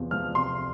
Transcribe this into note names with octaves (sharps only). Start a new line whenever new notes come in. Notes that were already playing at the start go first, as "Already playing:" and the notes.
Already playing: E2 C3 F3
F3 F6
C3 C6